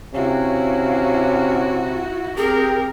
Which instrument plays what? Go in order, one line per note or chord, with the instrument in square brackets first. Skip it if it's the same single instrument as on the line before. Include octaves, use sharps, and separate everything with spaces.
[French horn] C3 [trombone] C#4 [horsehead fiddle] E4 F#4 [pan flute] F5
[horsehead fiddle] C4 A#4 [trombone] G4 [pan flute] G#4